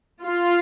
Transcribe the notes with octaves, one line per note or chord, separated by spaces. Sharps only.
F4